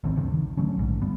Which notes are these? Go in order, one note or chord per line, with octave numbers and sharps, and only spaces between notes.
A1 D#3 C4
D2 G2 C#3
D#3
D3 F#3 A3 C#4
A#1 G#2
G1 G3 B3